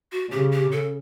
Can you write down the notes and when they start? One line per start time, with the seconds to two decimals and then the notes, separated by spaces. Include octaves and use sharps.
0.12 F#4
0.31 C#3 G4
0.52 G4
0.72 A4